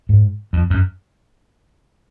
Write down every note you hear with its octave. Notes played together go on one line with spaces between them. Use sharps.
G#2
F2
F#2